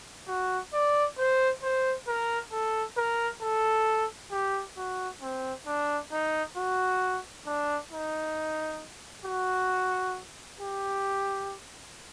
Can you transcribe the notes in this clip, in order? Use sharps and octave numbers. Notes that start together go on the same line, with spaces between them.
F#4
D5
C5
C5
A#4
A4
A#4
A4
G4
F#4
C4
D4
D#4
F#4
D4
D#4
F#4
G4